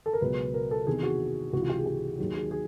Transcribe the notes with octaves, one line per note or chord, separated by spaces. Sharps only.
A4
A#4
C#2 B2 F#3 B4
A#4
A4
E2 C3 D#3 G#4
F#4
C#2 C3 E3 F#4
F4
G4
G#4
G4
D#2 D#3 F#3 G#4
G#4
G#4